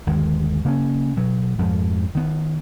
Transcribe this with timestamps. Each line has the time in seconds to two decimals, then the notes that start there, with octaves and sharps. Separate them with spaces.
0.07 G1 D#2 D#3 G#3
0.65 C#3 A#3 C4 C#4
1.17 B2 F#3
1.58 F2 G#2 F3
2.15 D#3 B3